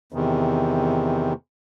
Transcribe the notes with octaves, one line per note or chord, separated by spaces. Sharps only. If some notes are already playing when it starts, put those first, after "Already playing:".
E2 C3 D#3